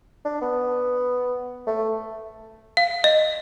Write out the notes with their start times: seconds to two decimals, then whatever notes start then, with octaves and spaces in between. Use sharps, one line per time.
0.25 D4
0.41 B3
1.67 A3
2.77 F5
3.04 D#5